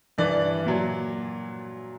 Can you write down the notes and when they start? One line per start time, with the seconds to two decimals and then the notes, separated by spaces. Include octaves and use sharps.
0.18 G2 E3 D5
0.66 A#2 F#3